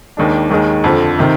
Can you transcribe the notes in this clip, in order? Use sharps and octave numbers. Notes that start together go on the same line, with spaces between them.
D#2 D#3 G#3 D4
D#2 D#3 G#3
F2 D3 F3
C3 D#3